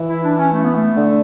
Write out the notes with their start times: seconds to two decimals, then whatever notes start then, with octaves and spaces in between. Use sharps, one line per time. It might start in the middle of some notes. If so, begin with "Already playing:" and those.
Already playing: E3
0.08 E4
0.23 D4
0.38 C#4
0.52 A3
0.63 B3
0.75 A3
0.96 D3